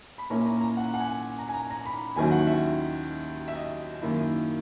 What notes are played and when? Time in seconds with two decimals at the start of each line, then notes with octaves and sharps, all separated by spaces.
0.18 B5
0.30 A#2 A#3 C#4 E4 A#5
0.45 A#5
0.61 A#5
0.77 F#5
0.94 F#5
1.00 G#5
1.39 A#5
1.49 G#5
1.54 A#5
1.70 A#5
1.86 B5
2.16 D#2 D#3 F#3 C#4 E4 G#5
2.31 F#5
2.47 E5
3.48 E5
3.55 D#5
4.02 F#2 D#3 A#3 E4